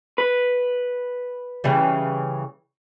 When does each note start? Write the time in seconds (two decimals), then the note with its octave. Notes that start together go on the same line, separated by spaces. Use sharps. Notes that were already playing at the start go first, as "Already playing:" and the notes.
0.18 B4
1.64 C#3 E3 G3